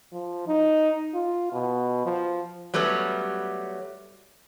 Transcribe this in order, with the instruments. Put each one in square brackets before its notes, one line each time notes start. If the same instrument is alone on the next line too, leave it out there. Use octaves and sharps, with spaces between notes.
[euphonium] F3
D#4
F4
B2
F3
[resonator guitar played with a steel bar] F#3 G3 A3 B3 C#4